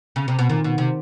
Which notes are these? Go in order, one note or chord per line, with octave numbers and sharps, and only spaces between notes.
C#3
C3
B2
A#2 D#3
B2
C3